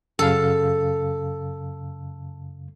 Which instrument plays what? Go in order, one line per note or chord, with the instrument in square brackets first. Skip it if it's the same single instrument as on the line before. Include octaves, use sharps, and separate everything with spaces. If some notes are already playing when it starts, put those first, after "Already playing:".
[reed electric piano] F#2 C#3 F5 [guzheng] A4